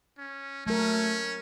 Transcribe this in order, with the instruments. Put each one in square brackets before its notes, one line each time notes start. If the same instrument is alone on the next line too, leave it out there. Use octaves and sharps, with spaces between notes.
[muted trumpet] C#4
[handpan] F#3 A#4 [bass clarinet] A3 [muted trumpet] C#4